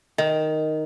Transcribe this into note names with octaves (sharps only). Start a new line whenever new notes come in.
D#3